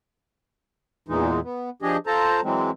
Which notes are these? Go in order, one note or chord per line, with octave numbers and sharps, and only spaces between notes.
E2 A#2 E3 G#3 D#4
B3
F3 D4 G4 G#4 D#5
F4 A4 C5 A5 A#5
E3 F#3 G#3 C4